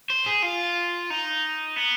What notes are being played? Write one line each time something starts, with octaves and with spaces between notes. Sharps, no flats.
C5
G#4
F4
D#4
B3